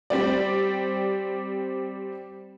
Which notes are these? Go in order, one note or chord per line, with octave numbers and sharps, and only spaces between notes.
G3 C4 D5